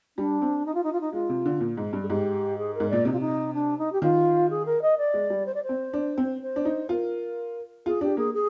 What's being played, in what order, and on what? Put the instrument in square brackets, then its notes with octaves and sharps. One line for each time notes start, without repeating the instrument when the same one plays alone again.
[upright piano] G3 [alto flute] D4
[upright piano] C4
[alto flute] D#4
F4
D#4
F4
D#4
[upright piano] G#3 [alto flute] F4
[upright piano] C3
D3
A#2
G#2
G2
[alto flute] G#4
[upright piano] G#2 [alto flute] G4
[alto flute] G#4
A#4
[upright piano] G#2
[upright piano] A#2 [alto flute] D5
[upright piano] C3 [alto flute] D#4
[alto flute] F4
D#4
D4
D#4
G4
[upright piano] D#3 [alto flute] F4
[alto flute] G#4
A#4
D#5
D5
[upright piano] G#3
G3
[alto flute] C5
D5
C5
[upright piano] C4
D4
C4
[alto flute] C5
[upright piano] D4
D#4
[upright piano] F4 [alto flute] A#4
[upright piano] F4 [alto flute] G#4
[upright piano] D4 [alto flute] G4
[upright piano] A#3 [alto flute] G#4
[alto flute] G#4